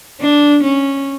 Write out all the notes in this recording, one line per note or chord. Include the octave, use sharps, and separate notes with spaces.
D4
C#4